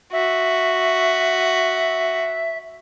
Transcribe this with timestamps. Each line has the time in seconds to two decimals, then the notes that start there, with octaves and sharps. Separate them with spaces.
0.13 F#4 E5